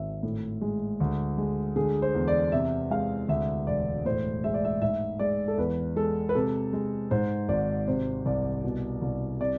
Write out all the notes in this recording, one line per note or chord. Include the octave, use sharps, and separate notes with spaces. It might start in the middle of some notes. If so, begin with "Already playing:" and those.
Already playing: G#1 E5
A2
G#3
D2
G#3
D3 G#4
C5
E2
D5
C3 E5
G#3 F5
D2 E5
E1 D5
A2 C5
G#3 E5
D5
E5
G#2 E5
G#3 D5
A4
E2 B4
G#3 A4
B4
C3 A4
G#3
G#2 C5
G#1 D5
C3 C5
C2 D5
B2
C2
C3 D5